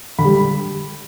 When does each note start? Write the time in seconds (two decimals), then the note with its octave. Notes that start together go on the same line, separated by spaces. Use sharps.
0.19 D3 B5
0.24 G3